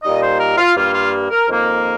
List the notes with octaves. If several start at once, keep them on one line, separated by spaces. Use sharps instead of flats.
A#2 G3 D#4 D#5
C5
A#4
F4
G2 G3 A#3 F4
F4
A#4
F2 D#3 A#3